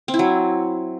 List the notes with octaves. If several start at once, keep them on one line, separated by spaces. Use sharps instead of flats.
C4
E4
F#3